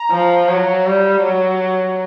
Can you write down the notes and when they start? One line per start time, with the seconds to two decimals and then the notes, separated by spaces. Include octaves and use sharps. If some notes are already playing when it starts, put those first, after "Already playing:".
Already playing: A#5
0.11 F3
0.48 F#3
0.86 G3
1.23 F#3